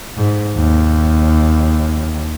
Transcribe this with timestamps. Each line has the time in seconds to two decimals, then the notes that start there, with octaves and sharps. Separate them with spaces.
0.17 G#2
0.57 D#2